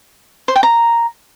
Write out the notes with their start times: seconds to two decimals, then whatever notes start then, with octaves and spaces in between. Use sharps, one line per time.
0.48 C5
0.56 G5
0.63 A#5